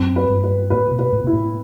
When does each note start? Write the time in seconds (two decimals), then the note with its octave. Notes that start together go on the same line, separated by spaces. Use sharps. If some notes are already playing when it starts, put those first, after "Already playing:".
Already playing: F#2 C4
0.16 B4
0.29 G2
0.44 B4
0.70 A2 B4
0.91 B2
0.99 B4
1.12 A2
1.24 B2 E4
1.33 A2